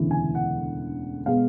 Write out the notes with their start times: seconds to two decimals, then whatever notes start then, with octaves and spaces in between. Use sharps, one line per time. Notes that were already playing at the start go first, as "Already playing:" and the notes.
Already playing: E1 D2 C#3 E3
0.11 G#5
0.35 F#5
1.26 B2 G#3 B3 F5